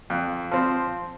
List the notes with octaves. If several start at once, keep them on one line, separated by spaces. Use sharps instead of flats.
F2
F3 C4